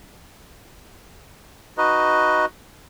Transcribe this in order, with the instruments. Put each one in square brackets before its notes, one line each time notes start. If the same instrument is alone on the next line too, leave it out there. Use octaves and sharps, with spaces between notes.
[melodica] D#4 F#4 B4 D#5